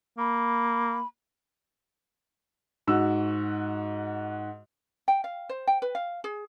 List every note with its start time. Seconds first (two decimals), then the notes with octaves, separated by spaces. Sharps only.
0.18 A#3 B5
2.87 G#2 F#4 E6
5.08 G5
5.24 F5
5.49 C5
5.67 G5
5.82 B4
5.95 F5
6.24 G#4